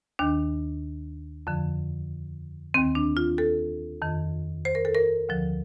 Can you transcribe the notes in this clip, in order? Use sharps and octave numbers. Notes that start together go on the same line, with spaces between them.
D#2 D#3 D4
F2 D3 F3
D#2 D#3 C4
D4
F4
A4
F2 D#3
C5
A#4
A4
A#4
D2 D3 F3